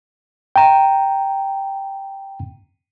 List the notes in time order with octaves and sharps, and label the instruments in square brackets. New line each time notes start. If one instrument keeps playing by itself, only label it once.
[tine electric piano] G5 A#5